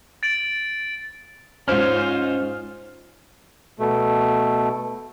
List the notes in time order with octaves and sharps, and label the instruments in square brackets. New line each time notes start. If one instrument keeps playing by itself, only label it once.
[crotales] A6 D7 F#7
[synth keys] G#2 C#4 [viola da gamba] D#4 F4 [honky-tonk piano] C5 F6
[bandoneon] B2 A3